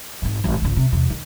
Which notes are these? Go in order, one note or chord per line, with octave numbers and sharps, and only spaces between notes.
G#1 G#2
G#1 D#2
G#1 C#2
C3
E2 C3
D#3